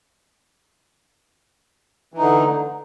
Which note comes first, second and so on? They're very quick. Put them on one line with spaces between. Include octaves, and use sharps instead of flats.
E3 D#4 D3